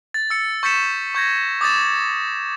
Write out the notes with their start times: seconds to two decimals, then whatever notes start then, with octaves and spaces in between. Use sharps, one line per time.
0.14 A6
0.30 E6 C#7
0.63 C#6 G6 A6 B6 C#7 E7
1.15 C#6 G6 G#6 A#6
1.61 D6 D#6 G6 A6 E7